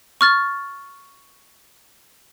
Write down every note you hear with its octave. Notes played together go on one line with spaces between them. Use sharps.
C#6 F6 A6